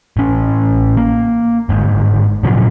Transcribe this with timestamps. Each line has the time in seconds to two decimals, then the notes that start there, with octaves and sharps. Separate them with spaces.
0.17 A1 C#4
0.97 A#3
1.69 G1 G#2
2.43 A#2 C#3 F3 F#3